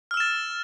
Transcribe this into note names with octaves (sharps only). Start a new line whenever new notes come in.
E6 F6 A6 E7